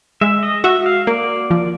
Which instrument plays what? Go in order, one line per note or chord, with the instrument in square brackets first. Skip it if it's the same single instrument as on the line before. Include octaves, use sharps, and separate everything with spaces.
[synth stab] G#3 [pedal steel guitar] E5
[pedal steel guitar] D#5
[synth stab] F#4 [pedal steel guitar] E5
[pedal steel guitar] F5
[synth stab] A#3 [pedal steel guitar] D5
[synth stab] F3